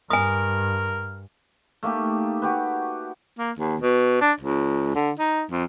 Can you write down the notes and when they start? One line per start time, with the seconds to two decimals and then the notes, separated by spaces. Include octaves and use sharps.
0.10 G2 A#4 G#5 D#6
1.83 A3 A#3 D#4 G4
2.42 F#4 G4 B4
3.39 A#3
3.59 D#2
3.82 B2
4.21 D4
4.40 C#2
4.95 D3
5.19 D#4
5.51 F2